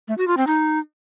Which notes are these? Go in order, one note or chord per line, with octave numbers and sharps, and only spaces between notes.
A3
F#4
F4
C4
D#4